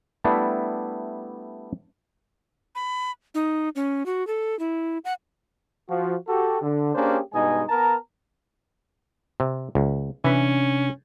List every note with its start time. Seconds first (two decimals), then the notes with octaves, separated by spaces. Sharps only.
0.24 G3 A3 B3 D4 E4
2.75 B5
3.35 D#4
3.76 C#4
4.06 F#4
4.27 A4
4.59 E4
5.05 F#5
5.89 F3 F#4
6.28 F#4 G4 A4
6.62 D3
6.95 A#3 C#4 D4 G4 G#4 C5
7.34 G2 B2 G#3 D#4 D#5 G#5
7.69 B3 A#4 A5 A#5
9.40 C3
9.75 C#2
10.24 C3 E3 C#4 D4 B4